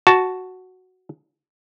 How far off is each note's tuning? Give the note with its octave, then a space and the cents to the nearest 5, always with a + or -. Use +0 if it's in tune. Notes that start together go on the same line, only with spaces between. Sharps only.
F#4 +0 A5 +0